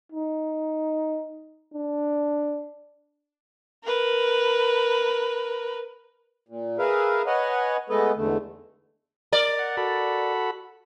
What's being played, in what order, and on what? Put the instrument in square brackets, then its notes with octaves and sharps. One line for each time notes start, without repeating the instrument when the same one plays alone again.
[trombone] D#4
D4
[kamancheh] A#4 B4
[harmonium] A#2
G#4 A#4 B4 E5 F5
B4 C#5 D#5 F#5 G#5
G#3 A3 B3 A4 B4 D#5
E2 G#2 D3 A3
[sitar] A#4 D5
[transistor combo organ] F#5
F#4 A4 B5